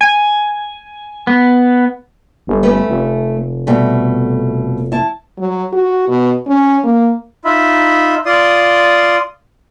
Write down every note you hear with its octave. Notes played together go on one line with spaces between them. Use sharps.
G#5
B3
G1
A3 C#4 B4
F1
B2 G3 A3
E4 A5
F#3
F#4
B2
C#4
A#3
D#4 F4 E5 B5
F4 D5 C6 D#6